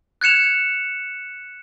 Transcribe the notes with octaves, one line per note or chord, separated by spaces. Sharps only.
F#6 G#6 C#7 E7 F7